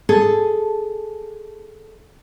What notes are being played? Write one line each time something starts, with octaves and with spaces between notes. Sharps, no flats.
G#4 A4